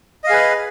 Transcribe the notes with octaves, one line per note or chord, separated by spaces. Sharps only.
G#4 B4 D#5 F5